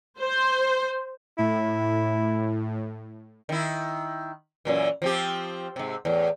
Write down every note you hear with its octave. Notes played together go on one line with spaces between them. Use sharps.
C5
A2 E4
D#3 E4
F#2 A#2 E3
F3 C4 G4
G#2 C3
E2 A2